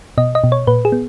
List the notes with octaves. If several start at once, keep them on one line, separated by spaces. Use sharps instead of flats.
B2 D#5
D#5
B2
C#5
A#2 B4
G#4
B3